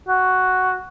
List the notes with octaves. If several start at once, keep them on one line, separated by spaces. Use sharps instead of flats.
F#4